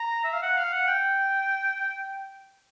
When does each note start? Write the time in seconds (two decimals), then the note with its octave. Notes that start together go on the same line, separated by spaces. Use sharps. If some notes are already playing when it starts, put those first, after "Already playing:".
Already playing: A#5
0.24 E5
0.33 F5
0.43 F#5
0.58 F5
0.73 F#5
0.88 G5